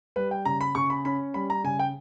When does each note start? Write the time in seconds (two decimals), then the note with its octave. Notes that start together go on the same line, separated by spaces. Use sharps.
0.16 G3 B4
0.31 G5
0.45 C#3 A#5
0.61 B5
0.75 C#3 C#6
0.90 B5
1.05 C#4 B5
1.34 G3 B5
1.50 A#5
1.64 C#3 G#5
1.79 G5